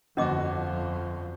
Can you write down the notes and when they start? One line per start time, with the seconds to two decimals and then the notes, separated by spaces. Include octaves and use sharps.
0.17 G1 F2 F3 C#4 F#4 D#5 D6